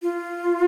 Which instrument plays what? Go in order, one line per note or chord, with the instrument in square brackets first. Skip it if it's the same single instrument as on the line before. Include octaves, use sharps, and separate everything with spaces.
[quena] F4